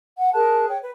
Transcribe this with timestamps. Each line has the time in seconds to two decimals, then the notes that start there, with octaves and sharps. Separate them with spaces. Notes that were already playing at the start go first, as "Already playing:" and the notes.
0.18 F#5
0.34 G#4 A#4 A5 F#6
0.70 C#5 G5
0.82 B4